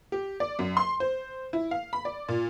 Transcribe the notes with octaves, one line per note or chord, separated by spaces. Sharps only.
G4
D5
F#2
C6
C5
E4
F5
B5
D5
A#2